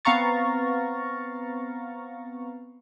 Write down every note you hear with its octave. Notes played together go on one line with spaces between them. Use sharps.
B3 C4 F5 A#5 C#6 A6